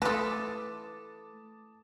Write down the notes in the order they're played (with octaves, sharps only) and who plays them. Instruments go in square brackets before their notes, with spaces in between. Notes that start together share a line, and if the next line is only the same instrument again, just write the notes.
[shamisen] E3 F4 [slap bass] A3 [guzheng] A4 B4 [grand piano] A5 D6 D#6